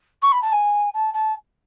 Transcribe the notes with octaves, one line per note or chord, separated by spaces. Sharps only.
C#6
B5
A5
G#5
A5
A5